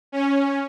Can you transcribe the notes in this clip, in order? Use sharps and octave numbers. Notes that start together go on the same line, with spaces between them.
C#4